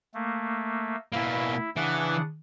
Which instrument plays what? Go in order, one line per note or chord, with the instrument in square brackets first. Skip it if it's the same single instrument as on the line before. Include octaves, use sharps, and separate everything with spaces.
[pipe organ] A3 A#3
[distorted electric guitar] B2 A#3 [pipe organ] E4
[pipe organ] C#3 D4 F#5 [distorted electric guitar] E3